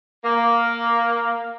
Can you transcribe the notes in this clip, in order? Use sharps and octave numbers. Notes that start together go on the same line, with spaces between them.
A#3